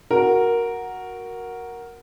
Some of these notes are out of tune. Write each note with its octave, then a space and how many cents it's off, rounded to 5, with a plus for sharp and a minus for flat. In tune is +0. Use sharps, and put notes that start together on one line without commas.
F#4 +0 A#4 +0